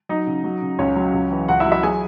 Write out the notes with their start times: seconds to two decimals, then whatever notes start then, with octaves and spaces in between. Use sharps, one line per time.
0.09 F#3 D#4 D#5
0.27 C#3
0.44 F#3
0.62 C#3
0.79 C#2 C#4 C#5
0.96 F#3
1.13 C#2
1.31 E3
1.48 C#2 F#4 F#5
1.60 E4 E5
1.66 F#3
1.72 E4 E5
1.83 F#3 G#4 G#5